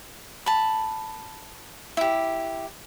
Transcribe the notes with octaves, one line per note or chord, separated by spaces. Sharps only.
A5 B5
E4 G4